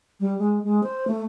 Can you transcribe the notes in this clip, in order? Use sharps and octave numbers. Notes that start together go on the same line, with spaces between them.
G3
G#3
G#3
C5
A3